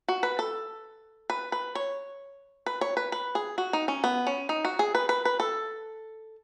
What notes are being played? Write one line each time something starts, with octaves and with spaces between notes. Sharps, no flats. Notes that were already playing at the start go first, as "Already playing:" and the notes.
F#4
B4
A4
B4
B4
C#5
B4
C#5
B4
B4
G#4
F#4
D#4
C#4
B3
C#4
D#4
F#4
G#4
B4
B4
B4
A4